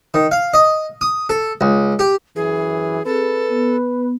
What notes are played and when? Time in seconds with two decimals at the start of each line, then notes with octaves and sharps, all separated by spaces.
0.14 D#3
0.32 F5
0.54 D#5
1.01 D#6
1.29 A4
1.61 C#2
1.99 G4
2.36 F#2 E3 G#4
3.05 C4 G#4 A4 B4
3.49 B3